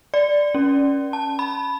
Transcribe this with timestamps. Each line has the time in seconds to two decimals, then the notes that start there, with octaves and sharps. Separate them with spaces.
0.14 D5
0.55 C#4
1.13 A5
1.39 B5